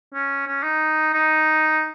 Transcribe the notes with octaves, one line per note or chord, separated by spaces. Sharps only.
C#4
C#4
D#4
D#4